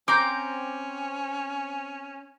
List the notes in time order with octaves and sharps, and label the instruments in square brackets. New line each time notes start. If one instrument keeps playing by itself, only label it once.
[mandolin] C4 A#5 G6 [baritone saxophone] C#4 [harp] D6